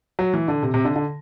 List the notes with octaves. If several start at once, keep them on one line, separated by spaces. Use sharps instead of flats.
F#3
E3
D3
C3
C3
D3
D3